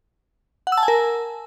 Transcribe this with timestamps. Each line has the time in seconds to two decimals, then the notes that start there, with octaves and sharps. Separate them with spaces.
0.67 F#5
0.72 E6
0.77 A5
0.83 G#5
0.88 A#4